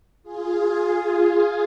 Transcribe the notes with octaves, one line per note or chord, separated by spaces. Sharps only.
F4 G#4